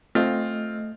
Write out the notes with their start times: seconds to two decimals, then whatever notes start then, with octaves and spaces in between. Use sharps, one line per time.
0.15 A3 C4 F4 D#5